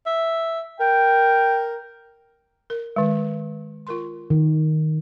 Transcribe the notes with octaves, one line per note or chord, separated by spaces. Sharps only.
E5
A#4 G5
A#4
D#3 G#3
F4 A#4 C6
D#3